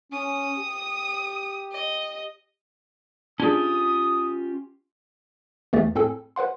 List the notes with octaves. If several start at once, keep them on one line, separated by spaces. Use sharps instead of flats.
C#4 D#6
G4
D#5
C#4 D4 F4 G4 G#4 D#6
E2 E3 A3 G4 A6
A2 C4 G#4 A4 G#5
B4 C5 F#5 C6